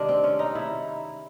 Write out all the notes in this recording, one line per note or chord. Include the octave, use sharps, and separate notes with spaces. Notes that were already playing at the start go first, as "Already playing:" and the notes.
Already playing: C3 D#3 G#3 D4
C4
C#4
D#4
E4